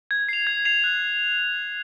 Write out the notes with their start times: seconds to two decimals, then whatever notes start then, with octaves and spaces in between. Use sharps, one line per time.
0.11 G#6
0.29 C7 F7
0.47 G#6
0.65 C7 F7
0.84 F#6